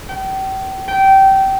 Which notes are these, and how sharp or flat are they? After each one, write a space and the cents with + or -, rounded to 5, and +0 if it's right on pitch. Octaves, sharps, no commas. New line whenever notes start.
G5 -35
G5 -20